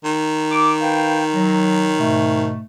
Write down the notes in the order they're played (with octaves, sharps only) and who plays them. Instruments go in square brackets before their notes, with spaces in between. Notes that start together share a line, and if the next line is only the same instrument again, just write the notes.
[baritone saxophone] D#3
[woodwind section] D6
B4 F5 G5
F#3
G#2 B2 A3